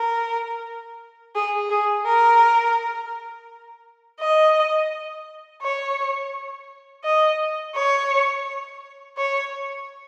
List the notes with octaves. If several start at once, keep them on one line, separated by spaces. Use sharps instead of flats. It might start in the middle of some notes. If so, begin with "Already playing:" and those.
Already playing: A#4
G#4
G#4
A#4
D#5
C#5
D#5
C#5
C#5